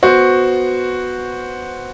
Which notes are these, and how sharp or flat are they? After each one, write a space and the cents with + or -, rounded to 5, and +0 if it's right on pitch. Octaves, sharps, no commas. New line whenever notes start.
B3 +0 F#4 -5 C5 +0